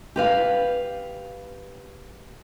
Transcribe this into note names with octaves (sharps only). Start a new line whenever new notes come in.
G4 B4 F5